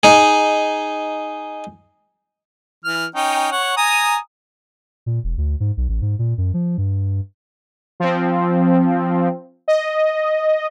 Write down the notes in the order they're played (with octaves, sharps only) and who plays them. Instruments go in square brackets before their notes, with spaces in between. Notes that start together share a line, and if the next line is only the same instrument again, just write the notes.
[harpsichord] D#4 G#4
[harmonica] E3 F6
C#4 D#4 G5
C#5 F#5
G#5 A#5 D#6
[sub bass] A#2
E1
D2
G#2
B1
A1
G#2
A#2
F#2
F3
G2
[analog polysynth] F3 C4
D#5